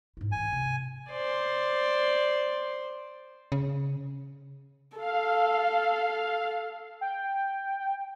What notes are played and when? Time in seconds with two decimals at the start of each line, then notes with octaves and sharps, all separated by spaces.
0.17 G#2 E4
0.32 D#3 E3 G#5
0.52 C3
1.10 C5 D5
3.52 C#3
4.97 A4 F5
7.01 G5